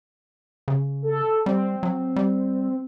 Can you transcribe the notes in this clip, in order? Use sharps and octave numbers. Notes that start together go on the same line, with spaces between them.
C#3
A4
G3 C4
F#3
G3